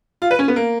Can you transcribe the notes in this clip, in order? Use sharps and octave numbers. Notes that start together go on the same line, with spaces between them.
F4
B4
C#4
B3
A#3